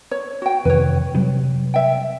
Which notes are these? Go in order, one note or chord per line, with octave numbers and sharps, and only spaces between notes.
C#5
F#4 G5
F2 C3 D#3 B4 C#5
C3 F#3 G3
E5 G5